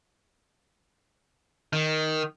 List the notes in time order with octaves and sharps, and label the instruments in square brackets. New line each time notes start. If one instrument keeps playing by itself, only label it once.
[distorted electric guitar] D#3